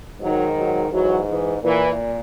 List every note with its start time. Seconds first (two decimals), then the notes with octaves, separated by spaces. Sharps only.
0.19 G#2 D#3 F#3
0.55 F#3
0.91 G#2 E3 F#3
1.27 E3 G#3
1.63 A#2 E3